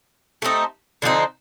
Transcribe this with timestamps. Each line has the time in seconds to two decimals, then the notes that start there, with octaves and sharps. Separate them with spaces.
0.42 A3 C4 D#4
1.02 D3 F3 C4 D#4